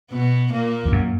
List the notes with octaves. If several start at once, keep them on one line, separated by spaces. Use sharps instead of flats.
B2 B3
A#2 A#3
E2
F#2